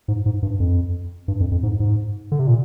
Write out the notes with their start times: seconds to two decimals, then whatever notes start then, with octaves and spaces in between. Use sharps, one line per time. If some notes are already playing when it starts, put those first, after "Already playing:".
0.08 G#2
0.26 G#2
0.43 G2
0.60 F2
1.28 G2
1.40 F2
1.52 F2
1.63 G#2
1.80 G#2
2.32 D3
2.39 C3
2.47 A#2